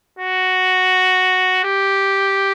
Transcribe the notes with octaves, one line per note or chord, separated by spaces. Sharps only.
F#4
G4